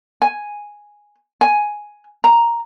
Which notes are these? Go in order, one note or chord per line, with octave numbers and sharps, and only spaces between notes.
G#5
G#5
A#5